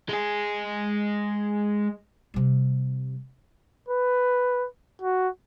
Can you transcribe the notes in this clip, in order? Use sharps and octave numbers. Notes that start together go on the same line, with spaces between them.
G#3 G#4
C3 G3
B4
F#4